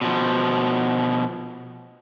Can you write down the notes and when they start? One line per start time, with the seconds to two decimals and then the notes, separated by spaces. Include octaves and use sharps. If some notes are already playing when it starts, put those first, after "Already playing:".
0.01 B2 F3